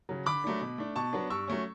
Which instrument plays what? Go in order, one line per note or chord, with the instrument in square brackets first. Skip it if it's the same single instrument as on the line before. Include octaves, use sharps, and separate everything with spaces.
[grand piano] C#3 F#3
D3 B5 D6
F#3 A3 D4
B2
A3 D4
B2 A5 C#6
F#3 B3 D4
G2 C#6 E6
F#3 A3 C#4